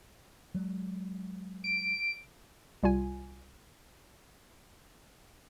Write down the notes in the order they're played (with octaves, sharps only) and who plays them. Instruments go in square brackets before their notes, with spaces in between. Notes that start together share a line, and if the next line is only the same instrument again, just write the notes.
[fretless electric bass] F#3 G#3
[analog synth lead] D7
[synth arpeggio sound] C2 G3 F4 G#5